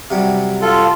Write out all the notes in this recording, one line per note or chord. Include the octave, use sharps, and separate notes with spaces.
C3 F#3 G3
F4 A4